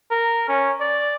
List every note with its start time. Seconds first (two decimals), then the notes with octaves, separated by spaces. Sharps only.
0.11 A#4
0.48 C#4
0.80 D5